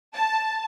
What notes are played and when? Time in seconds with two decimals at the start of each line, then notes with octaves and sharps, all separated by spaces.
0.14 A5